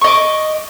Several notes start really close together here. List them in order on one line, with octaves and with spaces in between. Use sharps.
C#6 D#5 D6